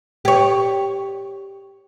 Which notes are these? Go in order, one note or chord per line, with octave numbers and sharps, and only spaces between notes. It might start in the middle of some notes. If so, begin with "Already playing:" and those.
G4 C#5